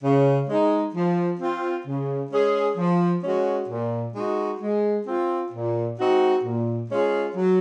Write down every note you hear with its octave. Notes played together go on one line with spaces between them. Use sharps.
C#3
G#3 D#4
F3
C4 F4
C#3
G#3 C#4 G#4
F3
G#3 C#4 F#4
A#2
G#3 D#4 F#4
G#3
C4 F4
A#2
G#3 C4 D#4 F#4
A#2
G#3 C#4 F4 G#4
F#3